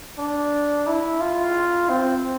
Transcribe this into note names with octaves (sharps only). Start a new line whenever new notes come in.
D4
E4
F4
C4